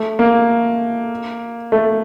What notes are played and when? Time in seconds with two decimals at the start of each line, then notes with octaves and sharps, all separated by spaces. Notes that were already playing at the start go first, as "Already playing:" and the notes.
Already playing: A3
0.19 A#3
1.72 A3